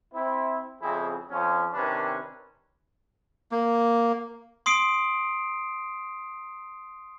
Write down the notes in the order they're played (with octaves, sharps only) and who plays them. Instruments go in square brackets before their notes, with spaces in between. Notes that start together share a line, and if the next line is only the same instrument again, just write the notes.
[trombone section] C4 E4
F2 C#3 C4 E4 G#4
F2 F3 C#4
C3 D#3 C#4 D4 B4
[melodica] A#3
[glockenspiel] C6 D#6 C7 D7